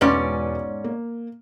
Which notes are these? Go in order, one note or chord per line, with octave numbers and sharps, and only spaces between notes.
E1 G#2 C#4 B4 D5
A#3